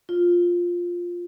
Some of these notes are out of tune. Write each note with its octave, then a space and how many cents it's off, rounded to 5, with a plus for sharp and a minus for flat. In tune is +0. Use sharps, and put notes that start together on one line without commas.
F4 +5